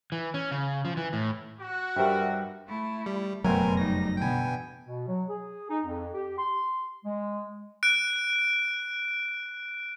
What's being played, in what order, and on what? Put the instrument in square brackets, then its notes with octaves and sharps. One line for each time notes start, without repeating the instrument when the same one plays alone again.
[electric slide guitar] E3
C#4
C#3
F3
E3
A2
[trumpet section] F#4
[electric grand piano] G2 G3 [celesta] G4 C5 G5 [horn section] A#4 E5 F#5
[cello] A3 E4
[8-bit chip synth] G3
[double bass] F#1 F2 [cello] B2 C4 [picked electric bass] F#3 A3 [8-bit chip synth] A#4 G#5
[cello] G3 D#4 [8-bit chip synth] A#6
[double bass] B2 D3 [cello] E3 B3 [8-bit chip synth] G5 G#5
[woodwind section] B2
F#3
G#4
D#4
F2
G4
C6
G#3
[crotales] F#6 D7